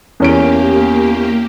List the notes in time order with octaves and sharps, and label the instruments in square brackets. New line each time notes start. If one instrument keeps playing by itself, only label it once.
[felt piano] E2 C#4 D7 [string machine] A#3 G4